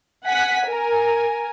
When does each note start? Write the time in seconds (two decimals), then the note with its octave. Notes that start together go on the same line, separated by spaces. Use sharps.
0.25 F#5 G#5 B6
0.67 A#4 G#5